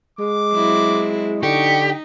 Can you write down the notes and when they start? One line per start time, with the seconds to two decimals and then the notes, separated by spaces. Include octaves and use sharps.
0.19 G#3 D6
0.53 F#3 C4 E4
1.43 D3 D#4 G4 C#6